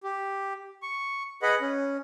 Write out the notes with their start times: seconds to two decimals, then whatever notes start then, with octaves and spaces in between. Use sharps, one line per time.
0.03 G4
0.82 C#6
1.42 G#4 B4 D#5 F#5 B5
1.61 C#4